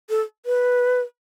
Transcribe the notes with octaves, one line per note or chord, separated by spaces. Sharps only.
A4
B4